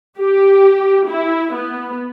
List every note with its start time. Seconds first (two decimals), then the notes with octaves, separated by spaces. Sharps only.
0.18 G4
1.09 E4
1.54 B3